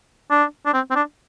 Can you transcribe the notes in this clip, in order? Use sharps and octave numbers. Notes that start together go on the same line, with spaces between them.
D4
D4
C4
C4
D4